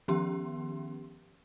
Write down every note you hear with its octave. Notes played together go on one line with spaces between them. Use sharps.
D#3 F3 B3 C#4 G4 C6